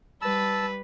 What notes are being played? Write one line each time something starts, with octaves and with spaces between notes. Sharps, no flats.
G3 B4 A5 E6